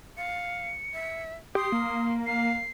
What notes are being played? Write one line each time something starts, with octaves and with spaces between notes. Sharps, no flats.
F5 C#7
E5
G4 C6 D#6
A#3
F5 C7